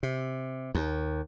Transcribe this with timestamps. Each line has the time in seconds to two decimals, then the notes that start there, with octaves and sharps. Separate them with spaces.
0.03 C3
0.75 D#2